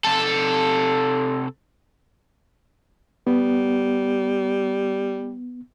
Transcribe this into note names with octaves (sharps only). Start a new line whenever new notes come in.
C3 A4
G3 B3